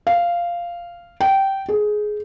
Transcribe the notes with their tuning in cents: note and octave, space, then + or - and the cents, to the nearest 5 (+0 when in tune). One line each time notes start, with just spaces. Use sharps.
F5 -10
G5 -15
G#4 +15